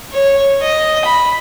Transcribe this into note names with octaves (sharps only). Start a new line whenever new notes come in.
C#5
D#5
B5